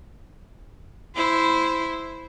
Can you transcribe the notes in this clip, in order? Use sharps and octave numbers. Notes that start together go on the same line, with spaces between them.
E4 C5